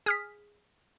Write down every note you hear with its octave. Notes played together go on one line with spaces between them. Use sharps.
G#4 D#6 F6 B6